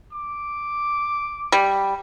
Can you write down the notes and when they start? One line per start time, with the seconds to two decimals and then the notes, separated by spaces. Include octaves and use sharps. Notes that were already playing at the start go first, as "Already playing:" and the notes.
0.13 D6
1.52 G3